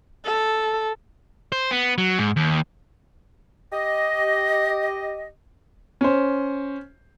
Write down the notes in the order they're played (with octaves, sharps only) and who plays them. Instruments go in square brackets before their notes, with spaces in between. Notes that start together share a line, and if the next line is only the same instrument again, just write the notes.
[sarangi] A4
[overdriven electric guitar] C5
B3
F#3
G#2
D#2
[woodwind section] G4 D#5
[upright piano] C#4 C5